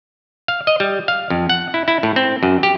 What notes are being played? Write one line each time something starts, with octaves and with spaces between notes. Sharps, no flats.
F5
D#5
G3
F5
F2
F#5
E4
E4
A2
C4
F#2
G4